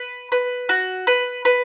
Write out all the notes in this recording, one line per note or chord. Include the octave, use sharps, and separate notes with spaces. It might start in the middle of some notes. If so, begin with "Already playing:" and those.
Already playing: B4
B4
F#4
B4
B4